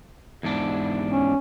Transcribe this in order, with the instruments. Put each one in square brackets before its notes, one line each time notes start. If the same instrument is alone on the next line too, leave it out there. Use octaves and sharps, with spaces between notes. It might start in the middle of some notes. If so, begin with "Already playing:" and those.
[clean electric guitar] E2 G#2 D4
[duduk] C#4